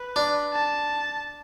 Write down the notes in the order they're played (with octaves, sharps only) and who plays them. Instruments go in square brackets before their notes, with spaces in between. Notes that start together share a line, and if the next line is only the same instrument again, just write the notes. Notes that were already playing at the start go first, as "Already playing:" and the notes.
Already playing: [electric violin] B4
[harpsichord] D4
[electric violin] A5